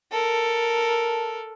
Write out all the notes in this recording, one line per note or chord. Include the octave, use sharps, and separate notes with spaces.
A4 A#4